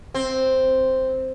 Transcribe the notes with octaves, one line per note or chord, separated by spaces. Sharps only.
C4